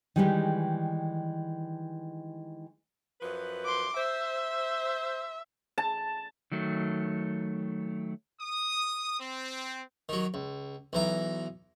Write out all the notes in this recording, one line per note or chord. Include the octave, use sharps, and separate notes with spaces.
D#3 E3 G3 G#3 D#4 G4
F#2 F3 B4
C6 D6
C5 E5
A5
D#3 F#3 A3
D#6
C4
D#3 F#3
C#2
B1 E3 A#5